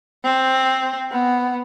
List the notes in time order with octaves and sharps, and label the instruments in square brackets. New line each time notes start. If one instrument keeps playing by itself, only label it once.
[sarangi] C4
B3